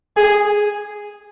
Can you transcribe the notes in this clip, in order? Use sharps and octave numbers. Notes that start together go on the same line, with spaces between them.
G#4